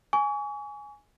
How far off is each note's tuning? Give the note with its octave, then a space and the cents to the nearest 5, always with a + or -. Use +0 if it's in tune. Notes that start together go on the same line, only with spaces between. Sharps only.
G#5 +0 C#6 +40